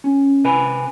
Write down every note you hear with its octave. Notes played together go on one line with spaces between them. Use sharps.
C#4
C3 B4 G#5 B5